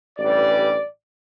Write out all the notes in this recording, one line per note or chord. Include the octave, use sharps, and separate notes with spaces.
A1 G2 E3 G3 D5